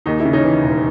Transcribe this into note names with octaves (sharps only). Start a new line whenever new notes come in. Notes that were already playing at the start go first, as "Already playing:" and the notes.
D#2 D#4
E4
C#3
C#4 D#4
E3
E1